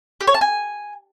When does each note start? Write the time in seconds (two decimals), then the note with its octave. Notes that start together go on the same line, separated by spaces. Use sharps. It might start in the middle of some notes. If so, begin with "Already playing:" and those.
0.21 G4
0.27 C#5
0.34 A5
0.41 G#5